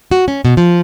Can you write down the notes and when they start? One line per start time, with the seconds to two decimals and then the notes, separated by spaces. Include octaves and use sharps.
0.11 F#4
0.28 C#4
0.45 B2
0.57 F3